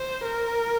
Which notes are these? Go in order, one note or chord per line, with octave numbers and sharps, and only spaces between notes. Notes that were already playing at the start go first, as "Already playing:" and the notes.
Already playing: C5
A#4